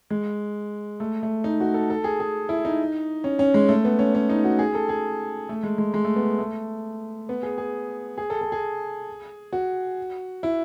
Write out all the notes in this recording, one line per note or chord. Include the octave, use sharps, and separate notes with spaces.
G#3
A3
A3
D#4
F#4
A4
A4
G#4
G#4
E4
D#4
C#4
C#4
G#3
A3
B3
C#4
C#4
D#4
F#4
G#4
A4
G#4
A3
G#3
G#3
G#3
A3
B3
A3
B3
G#4
G#4
G#4
A4
A4
G#4
F#4
E4